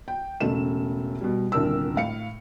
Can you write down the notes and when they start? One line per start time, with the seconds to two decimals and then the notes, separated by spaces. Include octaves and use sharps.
0.08 G5
0.40 E1 C#3 A3 E7
1.21 B2 G3
1.52 D#1 C2 D3 D4 A#4 E6
1.96 A2 F5 C#7